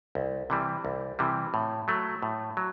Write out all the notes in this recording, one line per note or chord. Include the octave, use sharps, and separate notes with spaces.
C2
C3 E3 G3
C2
C3 E3 G3
A2
F#3 A3
A2
F#3